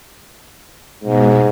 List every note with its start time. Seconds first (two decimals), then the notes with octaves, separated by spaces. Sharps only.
1.04 G#2 B2 G#3